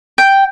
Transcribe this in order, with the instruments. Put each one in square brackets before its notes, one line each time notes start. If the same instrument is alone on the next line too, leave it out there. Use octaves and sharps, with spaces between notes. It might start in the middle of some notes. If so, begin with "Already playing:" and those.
[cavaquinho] G5